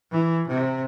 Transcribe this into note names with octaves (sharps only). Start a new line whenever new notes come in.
E3
C3